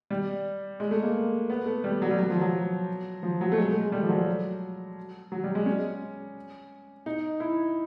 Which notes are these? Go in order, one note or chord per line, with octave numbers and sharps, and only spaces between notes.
G3
G#3
A3
A#3
B3
A3
G3
F#3
G3
F#3
F3
F#3
F3
F#3
A3
G#3
A3
G#3
G3
F3
F#3
F#3
G3
G#3
C#4
D#4
E4